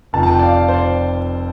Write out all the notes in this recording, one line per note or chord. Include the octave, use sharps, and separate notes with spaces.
F1 F2 F3 A5
A5
G5
D5
F5
F5
C5
D5